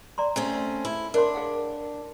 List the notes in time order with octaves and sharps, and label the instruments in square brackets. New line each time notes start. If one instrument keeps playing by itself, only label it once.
[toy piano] D5 A#5 C6
[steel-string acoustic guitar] A3 C4 C#4
E4
[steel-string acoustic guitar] D4 [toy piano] A#4 C#5 C6
[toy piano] G#4 F5 F#5